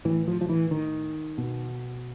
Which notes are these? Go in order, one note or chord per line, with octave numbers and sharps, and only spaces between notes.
A2 E3
F3
F3
E3
D#3
B2